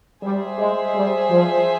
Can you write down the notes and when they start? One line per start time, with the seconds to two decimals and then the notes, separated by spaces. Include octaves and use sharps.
0.23 G3 G#4 C5 E5
0.58 G#3
0.95 G3
1.30 F3